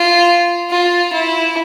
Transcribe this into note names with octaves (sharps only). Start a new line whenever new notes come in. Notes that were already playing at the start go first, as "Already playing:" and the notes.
Already playing: F4
F4
E4